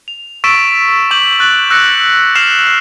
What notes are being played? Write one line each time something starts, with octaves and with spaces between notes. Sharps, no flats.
F7
C#6 E6 A6 B6 D7 E7
C#6 D6 G6 E7 F#7
C#6 F#6 A6 F#7
E6 F#6 A#6 B6 C#7
F6 C7 E7 F7